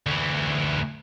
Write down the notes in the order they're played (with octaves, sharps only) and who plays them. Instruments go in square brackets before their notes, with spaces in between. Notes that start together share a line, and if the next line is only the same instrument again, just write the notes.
[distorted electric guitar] D2 E3